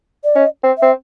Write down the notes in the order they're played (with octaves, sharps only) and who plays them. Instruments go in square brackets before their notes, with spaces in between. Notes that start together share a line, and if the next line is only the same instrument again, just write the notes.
[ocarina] D5
[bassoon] C#4 [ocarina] D#5
[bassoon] C4
[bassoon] C4 [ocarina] E5